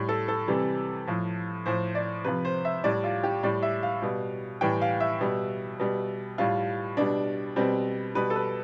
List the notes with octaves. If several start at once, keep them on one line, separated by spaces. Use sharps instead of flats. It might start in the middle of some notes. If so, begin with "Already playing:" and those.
Already playing: A2 G3
A4
A4
C3 E3 G3
A2 F3
A2 F3 C5
D5
C3 F3 B4
C5
E5
A2 G3 D5
F4
G4
A2 G3 D5
E5
F5
B2 G3
A2 E3 G3 G5
F5
E5
B2 G3
B2 G3
A2 G3 F4
B2 G3 D4
B2 G3 C4
B2 G3 B4
A4
B4